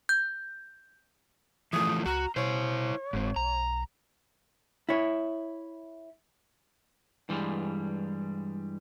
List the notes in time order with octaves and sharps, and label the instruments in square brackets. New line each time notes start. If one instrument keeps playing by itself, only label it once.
[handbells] G6
[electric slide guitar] E3 F3 A3 [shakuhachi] D#6
[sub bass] C#2 [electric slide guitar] F#4 [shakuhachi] A#5
[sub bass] B2 [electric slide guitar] E4 C5 [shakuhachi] C#5
[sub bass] F#1 [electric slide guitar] G#2 C4
[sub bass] B1 [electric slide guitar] A#5
[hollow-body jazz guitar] E4 C#5
[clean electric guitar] G2 E3 G3 G#3